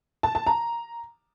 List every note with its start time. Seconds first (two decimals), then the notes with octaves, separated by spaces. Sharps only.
0.23 A5
0.35 A5
0.47 A#5